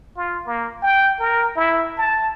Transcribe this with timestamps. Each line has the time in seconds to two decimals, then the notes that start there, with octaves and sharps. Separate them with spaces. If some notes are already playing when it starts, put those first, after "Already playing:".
0.16 F4
0.46 A#3
0.82 G5
1.19 A#4
1.56 E4
1.97 A5